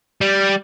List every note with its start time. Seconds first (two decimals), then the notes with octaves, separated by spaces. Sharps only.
0.21 G3